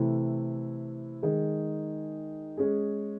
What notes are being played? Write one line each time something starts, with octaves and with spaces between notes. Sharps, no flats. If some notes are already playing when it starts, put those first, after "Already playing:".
Already playing: C3 E3 A3 C4 E4
D#3 G#3 D#4 G#4
G#3 C#4 G#4